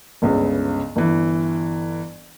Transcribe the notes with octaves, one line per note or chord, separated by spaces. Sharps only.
G1 C#2 C#3
G1 E3